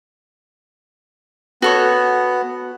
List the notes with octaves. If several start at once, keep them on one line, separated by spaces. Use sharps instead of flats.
B3 F#4 A4 C#5